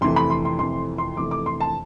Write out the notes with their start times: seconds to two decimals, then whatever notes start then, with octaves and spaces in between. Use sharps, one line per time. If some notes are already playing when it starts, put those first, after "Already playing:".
0.01 F2 C3 E3 A3 C6
0.16 B5
0.30 C6
0.45 C6
0.59 F2 C3 E3 A3 C6
0.98 C6
1.17 F2 C3 E3 A3 D6
1.31 D6
1.46 C6
1.61 A5